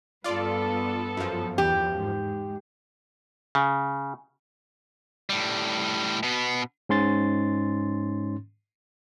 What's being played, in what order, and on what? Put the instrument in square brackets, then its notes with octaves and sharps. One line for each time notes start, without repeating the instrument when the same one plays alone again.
[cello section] G2 B3 A4 [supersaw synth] F4 D5
[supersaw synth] F#2 F3
[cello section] E2 [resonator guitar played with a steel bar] G4
[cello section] G#2
[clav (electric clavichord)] C#3
[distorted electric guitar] A2 G3
B2 B3
[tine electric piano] G#2 C#4 C6 A6